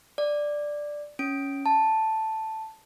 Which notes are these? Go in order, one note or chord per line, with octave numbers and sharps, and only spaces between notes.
D5
C#4 D7
A5